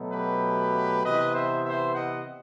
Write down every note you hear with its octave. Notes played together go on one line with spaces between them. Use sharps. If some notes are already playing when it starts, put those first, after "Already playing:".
Already playing: B2 F#3 A3
G4 B4
C3 E3 B3 B4 D#5
C5 E5
C5 E5
D#5 F#5